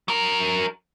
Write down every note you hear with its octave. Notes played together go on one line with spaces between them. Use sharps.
F#3 A#4